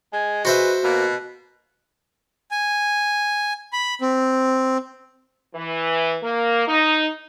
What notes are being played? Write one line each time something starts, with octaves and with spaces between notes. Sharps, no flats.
G#3 G#5
F#4 B4 C5 E5
B2 A#3
G#5
B5
C4
E3
A#3
D#4